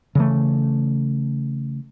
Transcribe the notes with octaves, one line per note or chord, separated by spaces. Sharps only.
C#3 E3 A3